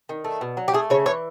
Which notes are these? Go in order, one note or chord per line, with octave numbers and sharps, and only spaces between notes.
D#3
A3
B2
F#3
G4
A3 G#4
C#3 C#5
E3 C#5